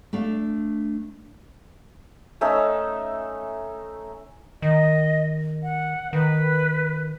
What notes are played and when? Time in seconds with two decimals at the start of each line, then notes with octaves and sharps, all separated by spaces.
0.13 A3 D4 F5
2.41 A3 C#4 D#4 E5
4.62 D#3 D#5
5.63 F#5
6.13 D#3 B4